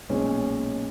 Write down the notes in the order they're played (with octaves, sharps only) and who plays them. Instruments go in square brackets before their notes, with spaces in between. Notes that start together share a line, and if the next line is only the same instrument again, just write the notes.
[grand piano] B1 A#2 G#3 C#4